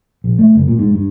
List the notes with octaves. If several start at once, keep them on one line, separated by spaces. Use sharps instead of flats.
A#1
A3
F#1
A#2
G#2
G2